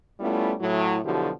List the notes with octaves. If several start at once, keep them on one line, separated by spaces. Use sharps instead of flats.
G3 A3 B3 C#4 E4 F4
A2 F#3 E4
B2 D3 F3 F#3 E4 G4